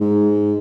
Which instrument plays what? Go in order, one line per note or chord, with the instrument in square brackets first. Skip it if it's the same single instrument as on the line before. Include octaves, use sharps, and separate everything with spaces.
[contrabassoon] G#2